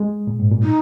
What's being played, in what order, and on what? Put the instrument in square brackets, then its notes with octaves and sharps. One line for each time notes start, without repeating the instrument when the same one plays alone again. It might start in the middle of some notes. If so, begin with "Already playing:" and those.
Already playing: [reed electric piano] G#3
A#2
G#2
A#2
[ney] D#4